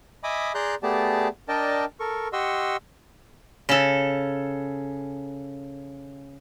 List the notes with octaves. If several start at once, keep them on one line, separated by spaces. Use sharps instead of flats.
D#5 E5 G#5 B5 D6 D#6
G#4 D5 A#5 C6 F#6 G6
A3 B3 G4 G#4 D5 A5
D4 A#4 D5 D#5 G5 A5
A4 A#4 C#6
G4 D#5 F#5 C6 C#6 E6
C#3 A4